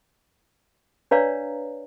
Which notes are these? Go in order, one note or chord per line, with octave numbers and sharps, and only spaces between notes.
D4 B4 C#5 D5 F5 A#5